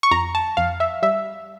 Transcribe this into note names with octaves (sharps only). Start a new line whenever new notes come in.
C#6
F2 A#5
A5
F2 F5
E5
G3 E5